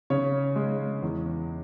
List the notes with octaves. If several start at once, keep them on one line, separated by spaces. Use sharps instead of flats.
C#3 C#5
G#3
E2